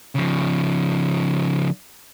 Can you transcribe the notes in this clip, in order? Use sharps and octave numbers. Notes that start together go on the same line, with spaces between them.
C#3 F3